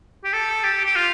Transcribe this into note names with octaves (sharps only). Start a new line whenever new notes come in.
G4
A4
G4
G4
F4